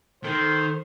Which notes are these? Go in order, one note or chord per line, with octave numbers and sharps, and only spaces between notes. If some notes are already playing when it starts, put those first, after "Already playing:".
D#3 A4 C5